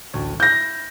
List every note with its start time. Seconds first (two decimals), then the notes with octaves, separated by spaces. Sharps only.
0.14 A1 D2 C#5
0.40 E4 G6 A#6